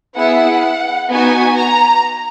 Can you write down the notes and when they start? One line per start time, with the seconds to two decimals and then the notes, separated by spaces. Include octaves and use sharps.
0.16 B3 E4 G#4 F#5
1.10 B3 D#4 F#4 G#5
1.57 A#5